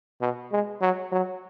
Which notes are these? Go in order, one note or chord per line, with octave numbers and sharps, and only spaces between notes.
B2
G#3
F#3
F#3